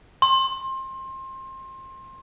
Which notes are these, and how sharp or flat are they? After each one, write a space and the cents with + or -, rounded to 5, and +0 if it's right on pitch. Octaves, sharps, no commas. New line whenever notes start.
C6 +25